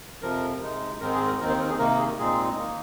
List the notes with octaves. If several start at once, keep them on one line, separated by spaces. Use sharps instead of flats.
F2 C3 F3 A#4
C3 G#3 D#4
G#2 D#3 G#3 C4 D#4 A#4
G#4
A#4
D#2 D#3 C4 D#4 A#4
C5
A#4
G#4
C3 D#3 A#3 D#4 A#4
G#4
A#2 G#3 C4 D#4 G#4
D#3 A#3 D#4